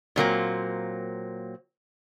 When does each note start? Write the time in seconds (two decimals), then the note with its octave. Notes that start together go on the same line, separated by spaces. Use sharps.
0.16 A#2 F#3 A#3 C4